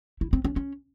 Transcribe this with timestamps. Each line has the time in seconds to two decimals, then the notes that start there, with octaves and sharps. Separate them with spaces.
0.21 E4
0.33 C4
0.45 C#4
0.56 C#4